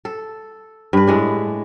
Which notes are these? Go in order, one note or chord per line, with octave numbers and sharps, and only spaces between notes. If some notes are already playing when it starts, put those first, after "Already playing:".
A4
G2 B4
A2 G#3 D4